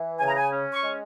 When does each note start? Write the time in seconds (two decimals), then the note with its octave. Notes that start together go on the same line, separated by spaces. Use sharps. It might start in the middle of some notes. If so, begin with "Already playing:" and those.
Already playing: E3
0.19 C#3 G#5
0.28 A#5
0.37 G#5
0.51 C#4
0.73 C#6
0.83 G#3